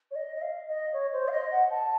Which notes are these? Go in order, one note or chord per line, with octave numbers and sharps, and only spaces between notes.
C#5
D#5
D#5
F5
D#5
C#5
C5
F5
D#5
F#5
A5